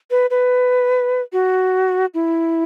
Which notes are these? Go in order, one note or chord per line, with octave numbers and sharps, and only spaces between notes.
B4
B4
F#4
E4